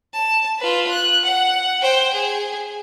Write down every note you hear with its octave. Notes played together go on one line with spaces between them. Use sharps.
A5
F4 B4
F#6
F#5
C5 G5
G#4